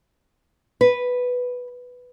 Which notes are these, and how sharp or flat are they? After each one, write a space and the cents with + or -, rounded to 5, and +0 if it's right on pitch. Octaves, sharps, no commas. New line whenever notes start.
B4 +0